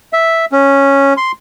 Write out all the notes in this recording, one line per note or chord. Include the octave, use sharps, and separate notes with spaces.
E5
C#4
C6